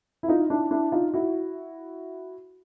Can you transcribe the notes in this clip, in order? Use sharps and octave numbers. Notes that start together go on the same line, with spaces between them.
E4
D#4 F4
D4 E4
D4 E4
D#4 F4
E4 F#4